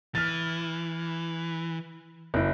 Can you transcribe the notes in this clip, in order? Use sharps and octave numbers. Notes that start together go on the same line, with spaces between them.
E3 F6 A6
F#1 E4